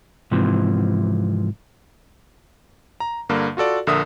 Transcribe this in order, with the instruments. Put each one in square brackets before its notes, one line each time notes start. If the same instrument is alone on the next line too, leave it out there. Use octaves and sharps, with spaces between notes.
[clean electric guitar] G#2 C3 E3 F3
[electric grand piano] A#5
G2 D3 A#3
F4 F#4 A4 D5
A#1 D3 A#4 E5 D#6